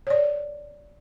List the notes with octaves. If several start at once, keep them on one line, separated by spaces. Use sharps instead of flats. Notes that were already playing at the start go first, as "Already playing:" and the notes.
C#5 D5